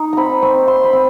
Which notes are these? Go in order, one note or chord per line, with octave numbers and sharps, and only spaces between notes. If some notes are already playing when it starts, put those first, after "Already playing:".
Already playing: D#4
C4 A#5 B5
C4 C#6
C4 C6
B5
C4